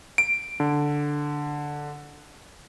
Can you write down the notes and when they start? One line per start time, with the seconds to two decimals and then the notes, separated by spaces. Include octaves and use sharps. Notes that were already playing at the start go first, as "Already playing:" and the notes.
0.18 D7
0.60 D3